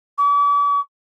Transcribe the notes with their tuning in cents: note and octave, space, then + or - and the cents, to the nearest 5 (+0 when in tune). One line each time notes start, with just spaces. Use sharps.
D6 -45